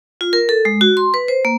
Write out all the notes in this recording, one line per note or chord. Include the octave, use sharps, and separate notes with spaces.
F4
A#4
A4
G#3
F#4
C6
B4
C5
A#3